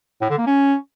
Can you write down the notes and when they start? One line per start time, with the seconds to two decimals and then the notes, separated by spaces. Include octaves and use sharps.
0.21 A2
0.30 D3
0.38 A#3
0.46 C#4